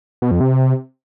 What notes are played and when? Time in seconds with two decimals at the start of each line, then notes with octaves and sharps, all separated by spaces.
0.22 B2
0.31 F2
0.40 C3